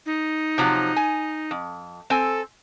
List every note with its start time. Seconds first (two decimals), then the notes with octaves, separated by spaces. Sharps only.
0.06 D#4
0.58 C3 F3 F#3
0.96 G#5
1.51 F2
2.10 C4 A4 G#5